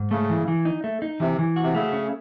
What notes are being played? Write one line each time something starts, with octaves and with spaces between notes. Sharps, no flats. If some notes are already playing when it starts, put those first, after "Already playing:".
Already playing: G#2
C#3 A3
E3
E3
D#4
A3
D#4
C3 E3
E3
F#4
C3
C#3 A3
C#4